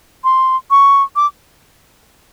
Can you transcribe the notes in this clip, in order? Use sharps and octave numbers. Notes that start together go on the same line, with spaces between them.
C6
C#6
D6